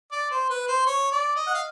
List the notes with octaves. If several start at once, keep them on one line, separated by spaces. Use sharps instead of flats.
D5
C5
B4
C5
C#5
D5
D#5
F#5
F5